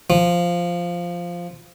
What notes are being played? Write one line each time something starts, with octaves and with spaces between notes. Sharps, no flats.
F3